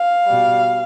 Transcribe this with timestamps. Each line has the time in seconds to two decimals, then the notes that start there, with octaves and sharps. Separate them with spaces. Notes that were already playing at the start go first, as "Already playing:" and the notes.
Already playing: F5
0.26 B2 G3